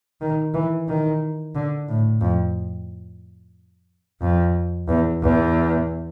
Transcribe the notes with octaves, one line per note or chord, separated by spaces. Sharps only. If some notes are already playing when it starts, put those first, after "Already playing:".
D#3
E3
D#3
D3
A2
F2
F2
E2
E2